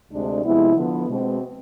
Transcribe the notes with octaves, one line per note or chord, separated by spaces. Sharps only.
D2 C3 G#3 D4
C3 F3 G#3 B3 E4
D3 F3 B3
B2 G#3 C4